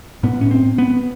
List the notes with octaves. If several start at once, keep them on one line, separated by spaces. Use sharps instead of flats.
A2 B3
C#4
C4
B3